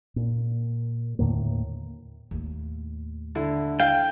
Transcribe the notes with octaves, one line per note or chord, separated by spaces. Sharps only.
A#2
D#2 A2 D3 A#3
D#2 A2
D3 E4
F5 G5